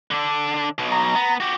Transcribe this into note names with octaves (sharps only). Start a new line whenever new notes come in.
D3 D4
B1 B2
A#5
B3
F#4 G4